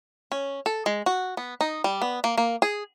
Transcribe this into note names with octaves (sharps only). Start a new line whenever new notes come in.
C#4
A4
G#3
F#4
B3
D#4
G3
B3
A#3
A#3
G#4